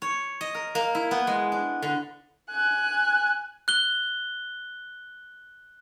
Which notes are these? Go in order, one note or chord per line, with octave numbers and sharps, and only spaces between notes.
C#5
D#5
A#4
A#3
E4
B3
G#3
D4
D3
G#5 F#6
F#6 G7